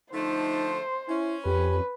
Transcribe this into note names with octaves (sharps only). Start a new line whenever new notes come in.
D3 F3 A3 D#4 C5
C#4 E4
F2 G4 B4